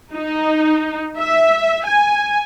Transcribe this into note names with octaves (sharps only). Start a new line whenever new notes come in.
D#4
E5
G#5